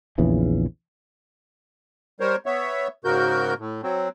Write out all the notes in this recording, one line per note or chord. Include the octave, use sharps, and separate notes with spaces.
A#1 E2 C#3 E3
G3 A#4 C5 C#5
B3 C#5 E5
G#2 C#3 F#4 A#4 G6
A2
F#3 C4